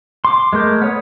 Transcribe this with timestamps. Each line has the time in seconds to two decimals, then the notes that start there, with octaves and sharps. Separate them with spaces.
0.25 C6 D6
0.53 G#3 A3 A#4 G6
0.82 B3 C#5 D#6